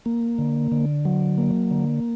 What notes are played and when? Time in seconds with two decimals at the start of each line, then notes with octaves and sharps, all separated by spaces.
0.06 A#3
0.38 D3
0.72 D3
1.05 F#3
1.38 A#3
1.71 D3